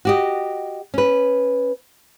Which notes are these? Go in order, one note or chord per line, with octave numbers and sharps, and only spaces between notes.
F#4 G4 D#5
C#4 B4